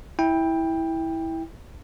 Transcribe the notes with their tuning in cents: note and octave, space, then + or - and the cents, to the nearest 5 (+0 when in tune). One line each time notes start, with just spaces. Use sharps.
E4 -15 G5 +15